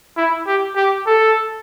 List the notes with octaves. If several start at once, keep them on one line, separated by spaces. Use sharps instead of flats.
E4
G4
G4
A4